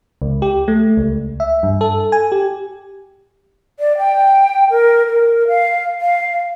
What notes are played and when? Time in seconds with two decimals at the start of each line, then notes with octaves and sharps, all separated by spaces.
0.22 C#2
0.42 G4
0.68 A3
0.97 C#2
1.40 E5
1.63 G2
1.81 A4
2.12 G#5
2.32 G4
3.80 D5
3.98 G5
4.70 A#4
5.07 A#4
5.48 F5
6.01 F5